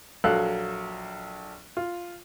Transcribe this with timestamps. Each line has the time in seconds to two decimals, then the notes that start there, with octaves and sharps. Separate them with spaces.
0.24 A#1 F#3 A4 F5 F#6
1.77 F4